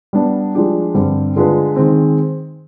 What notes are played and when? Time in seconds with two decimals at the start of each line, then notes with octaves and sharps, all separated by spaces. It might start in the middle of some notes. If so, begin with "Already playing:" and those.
0.13 G3 B3 D4
0.55 F3 G#3 D4 G4
0.94 G2 D3 G3 C4
1.36 D3 G#3 D4 F4 B4
1.76 D#3 G#3 C4